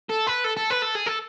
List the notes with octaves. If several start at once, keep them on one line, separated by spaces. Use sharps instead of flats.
A4
B4
A4
A4
B4
A4
G#4
A4